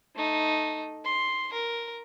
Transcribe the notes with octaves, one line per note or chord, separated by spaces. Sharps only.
A3 D#4
C6
A#4